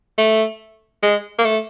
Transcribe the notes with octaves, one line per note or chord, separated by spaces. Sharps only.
A3
G#3
A#3
A3